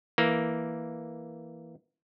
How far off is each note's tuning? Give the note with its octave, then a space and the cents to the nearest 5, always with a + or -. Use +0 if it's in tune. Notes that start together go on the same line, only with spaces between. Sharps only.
E3 +0 A#3 +0